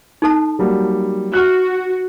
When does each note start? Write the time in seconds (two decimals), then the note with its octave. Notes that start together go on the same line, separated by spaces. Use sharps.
0.22 D#4 A4 A5
0.59 F#3 G3 A#3
1.34 F#4 F6 F#6